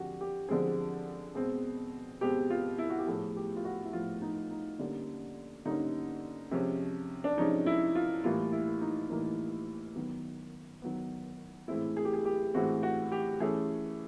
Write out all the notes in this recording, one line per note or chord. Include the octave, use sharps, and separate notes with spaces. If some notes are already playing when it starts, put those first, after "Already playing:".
Already playing: D3 F3 G#3 C4 F#4 G4
G4
D3 F3 G#3 C4 G#4
B2 G#3 C4
B2 G#3 C4 G4
F4
E4
F#4
G4
A2 F3 A3 G#4
G4
F4
F#4
E4
A2 F3 A3 F4
D#4
D#4
D3 G3 A#3 C#4
D3 G3 A#3 C#4 D#4
C3 F3 G#3 C#4
D4
C3 F3 G#3 C#4 D#4
E4
F4
A2 E3 G3 A#3 F4
E4
D#4
A2 E3 G3 A#3 D#4
D#3 F#3 B3
D#3 F#3 B3
A2 E3 G#3 C4 E4
G#4
G4
G#4
G4
A2 E3 G#3 C4 F#4
F#4
G4
E3 A3 C#4 G#4